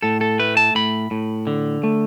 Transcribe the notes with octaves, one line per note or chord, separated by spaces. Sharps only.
A2 A4
A4
A3 B4
A5
A2 B5
A2
D3
A3